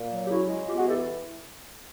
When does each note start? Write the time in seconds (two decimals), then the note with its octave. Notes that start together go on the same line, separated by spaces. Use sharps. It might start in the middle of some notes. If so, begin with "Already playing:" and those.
Already playing: A#2
0.11 F#3
0.25 G4
0.30 C#3 E4 F#4
0.49 G#3
0.68 B3 F4 G4
0.78 F#4 G#4
0.87 E3 G4 A4